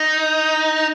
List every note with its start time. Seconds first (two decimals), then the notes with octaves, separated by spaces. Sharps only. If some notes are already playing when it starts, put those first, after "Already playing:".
Already playing: D#4